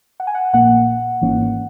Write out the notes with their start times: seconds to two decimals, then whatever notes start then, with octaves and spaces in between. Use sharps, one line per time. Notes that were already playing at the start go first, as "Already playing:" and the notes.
0.20 F#5
0.27 G#5
0.35 F#5
0.53 A#1 A#2 A#3 F#5
1.21 G#1 G#2 E3 A#3 C#4